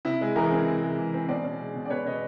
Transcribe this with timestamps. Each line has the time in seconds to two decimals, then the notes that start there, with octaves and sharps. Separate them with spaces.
0.05 C3 E4
0.21 G#3
0.36 E3 G#4 A#4
0.51 C4
0.67 C3
0.83 G#3
0.98 E3
1.14 C4
1.28 B2 C5 D5
1.44 C#4
1.59 G#3
1.75 B2
1.85 D5
1.90 B2 B4 C#5
2.05 C#4 C#5 D#5